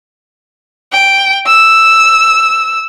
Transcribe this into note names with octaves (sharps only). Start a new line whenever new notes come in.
G5
E6